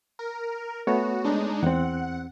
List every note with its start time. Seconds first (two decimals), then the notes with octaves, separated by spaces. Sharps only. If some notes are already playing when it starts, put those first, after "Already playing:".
0.19 A#4
0.87 A3 B3 F#4 C#5
1.24 G#3 D4 D#4
1.63 E2 C4 F#5